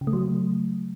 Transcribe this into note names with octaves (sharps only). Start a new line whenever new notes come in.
C#3
A3
F#3